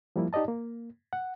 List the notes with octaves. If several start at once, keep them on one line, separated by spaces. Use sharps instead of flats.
F3 G3 A#3 E4
D#4 G4 D5 D#5 A5
A#3
F#5